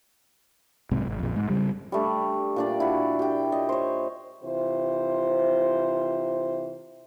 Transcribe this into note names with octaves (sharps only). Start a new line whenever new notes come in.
B1 G#2 C3
G#1
A#1 F2
G#2
C#3 G3
G3 A3 D4
A#2 D4 D5
E4 F#4
G4 G5
D#5
C5 C#5
C3 E3 F4 C5